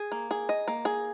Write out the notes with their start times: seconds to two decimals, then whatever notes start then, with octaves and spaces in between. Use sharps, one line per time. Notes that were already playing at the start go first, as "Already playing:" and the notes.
Already playing: G#4
0.12 A#3
0.31 G#4
0.49 D#5
0.68 A#3
0.85 G#4